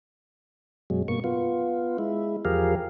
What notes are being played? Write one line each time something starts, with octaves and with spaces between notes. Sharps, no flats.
F#2 B2 F#3 G#3
G2 B2 A#3 C#6
B3 F4
G#3 E4
E2 F3 G4 G#4 A#4 F5